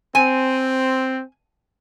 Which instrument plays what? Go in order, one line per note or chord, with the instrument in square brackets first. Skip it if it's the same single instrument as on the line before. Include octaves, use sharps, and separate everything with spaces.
[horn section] C4 [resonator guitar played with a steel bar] G#5